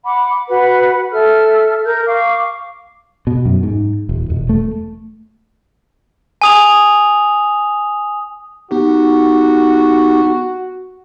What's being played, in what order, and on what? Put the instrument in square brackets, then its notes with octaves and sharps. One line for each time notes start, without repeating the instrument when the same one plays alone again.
[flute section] F#5 B5 D6
F#4 B4 F#5 B5
A4 E5 F6
A#4 G6
F5 C#6 D6
[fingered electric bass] B2
F#2
G#2
D#1
E1
A3
[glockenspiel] G#5 D#6 F7
[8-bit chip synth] B3 D#4 G4 [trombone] F#4